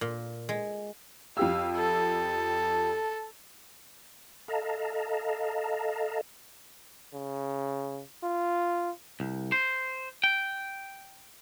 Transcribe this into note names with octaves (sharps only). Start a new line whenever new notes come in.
A#2
G#3
F2 G4 F5 E6
A4
A4 D#5 F5 A5 A#5
C#3
F4
C2
C5
G5